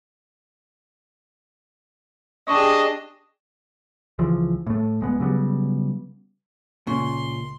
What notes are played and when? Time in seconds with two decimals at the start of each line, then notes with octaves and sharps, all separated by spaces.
2.48 D4 G4 G#4 D#5 A5 C#6
4.19 C#2 E3 F3
4.67 A2 A3
5.01 D1 G#3 B3
5.20 C#3 F#3 G3 B3
6.87 C#2 A#2 C#4 C6